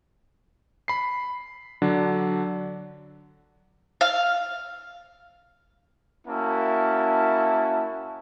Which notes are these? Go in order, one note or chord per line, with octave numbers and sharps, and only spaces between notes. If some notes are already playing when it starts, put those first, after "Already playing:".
B5 C7
D3 F#3 D4
F5
A#3 C#4 E4 F#4 E5 A5